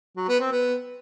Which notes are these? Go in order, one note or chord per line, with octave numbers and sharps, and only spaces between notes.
F#3
B3
C4
B3